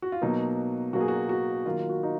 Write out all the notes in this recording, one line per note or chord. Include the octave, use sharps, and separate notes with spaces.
F#4
F4
B2 F#3 A#3 D#4
B2 F#3 A#3 F#4
G#4
F#4
F#4
D#3 F#3 A#3 F4
F4
F#4
D#4